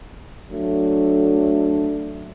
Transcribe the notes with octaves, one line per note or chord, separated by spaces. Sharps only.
F#3 A3 D4